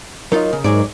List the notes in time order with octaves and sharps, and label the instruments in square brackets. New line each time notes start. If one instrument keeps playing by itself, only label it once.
[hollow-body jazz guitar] F#3 D#4 F4 [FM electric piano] A#4 D#5
[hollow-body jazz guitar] C#3
[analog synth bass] G#2 [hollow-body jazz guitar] F#3 G#4 D5